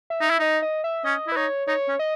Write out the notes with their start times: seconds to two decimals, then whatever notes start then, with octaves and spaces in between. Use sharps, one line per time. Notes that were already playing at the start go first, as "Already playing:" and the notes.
0.10 E5
0.21 D#4
0.30 E4
0.39 D#4 D#5
0.62 D#5
0.84 E5
1.04 C#4 D#5
1.27 E4
1.32 B4
1.36 D#4 C#5
1.67 D#4 C#5
1.88 C#4
1.99 D#5